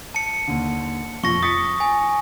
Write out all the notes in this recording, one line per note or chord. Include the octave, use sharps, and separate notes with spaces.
A5 C#7
D#2 D3
F2 A#2 C#6 A#6
D#6 A6 B6 C#7
G#5